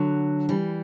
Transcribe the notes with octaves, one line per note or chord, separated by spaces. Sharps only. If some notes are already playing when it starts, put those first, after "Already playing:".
Already playing: D3 F#3
E3 G3